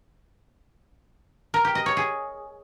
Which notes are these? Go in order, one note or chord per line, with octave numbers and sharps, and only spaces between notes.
A#4
G4
D#5
C#5
G#4